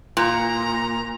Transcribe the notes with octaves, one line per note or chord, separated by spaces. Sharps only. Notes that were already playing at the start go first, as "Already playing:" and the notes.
A#2 A#5